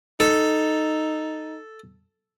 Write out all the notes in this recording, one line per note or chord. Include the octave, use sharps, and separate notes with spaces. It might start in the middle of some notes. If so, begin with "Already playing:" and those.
D#4 A4